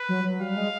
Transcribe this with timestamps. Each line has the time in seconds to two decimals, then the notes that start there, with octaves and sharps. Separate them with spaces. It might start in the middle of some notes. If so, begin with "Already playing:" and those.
Already playing: B4
0.09 F#3
0.24 F#3
0.40 G3 F5
0.56 G#3